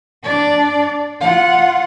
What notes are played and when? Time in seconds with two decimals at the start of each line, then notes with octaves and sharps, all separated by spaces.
0.23 D4 D5
1.20 F4 F#5